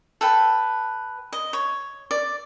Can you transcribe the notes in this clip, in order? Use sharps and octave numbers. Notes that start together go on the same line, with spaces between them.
A4 B4 G5
D#5
C#5
D5